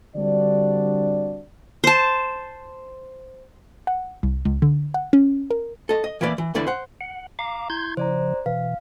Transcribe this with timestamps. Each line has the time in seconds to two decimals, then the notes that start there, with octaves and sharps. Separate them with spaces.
0.15 D3 G3 C4 D4 F#4 D5
1.84 C5 A5
3.87 F#5
4.23 C2
4.45 C#2
4.62 D3
4.94 F#5
5.13 C#4
5.50 A#4
5.89 A4 D#5
6.04 D#5
6.21 E3 A#3 B4 D5
6.38 E3
6.54 E2 D3 E3 D5 B5
6.67 C5 F#5
7.01 F#5
7.39 F5 A#5 D6
7.70 E4 C6 G6 G#6
7.97 C#3 F3 C5 D5 A#5
8.46 B2 E3 F5